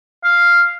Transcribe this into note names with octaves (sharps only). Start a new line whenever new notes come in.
F5